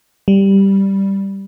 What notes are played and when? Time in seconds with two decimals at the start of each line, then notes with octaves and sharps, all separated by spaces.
0.28 G3